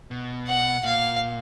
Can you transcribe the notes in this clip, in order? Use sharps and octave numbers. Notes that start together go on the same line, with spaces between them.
B2
F#5
A#2 F5